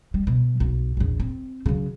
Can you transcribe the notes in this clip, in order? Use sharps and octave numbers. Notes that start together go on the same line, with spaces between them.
G3
B2
B1
A#1 E2
C4
C#3 F#3